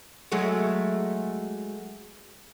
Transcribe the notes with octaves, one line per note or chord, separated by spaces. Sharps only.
F#3 G#3 A3